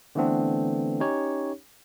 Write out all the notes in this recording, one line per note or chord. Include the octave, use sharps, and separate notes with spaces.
D3 E3 A3 B3 C4 D4
C#4 D#4 G4 C#5